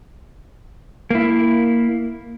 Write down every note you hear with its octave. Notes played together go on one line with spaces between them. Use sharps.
A#3 E4